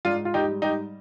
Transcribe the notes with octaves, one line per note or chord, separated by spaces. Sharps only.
G#2 D4 F4
F4
D#4 G4
G3
D#4 G4